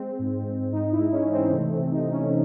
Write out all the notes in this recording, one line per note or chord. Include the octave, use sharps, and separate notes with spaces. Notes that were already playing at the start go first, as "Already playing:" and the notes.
Already playing: G#3 C4
G#2
G#2
G#2 D#4
E4
G#3
C#4
E3
C4
C3 A3
C4
C3
D#4
C3
C#4